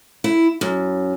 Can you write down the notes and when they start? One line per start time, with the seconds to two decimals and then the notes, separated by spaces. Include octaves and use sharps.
0.24 E4
0.61 F#2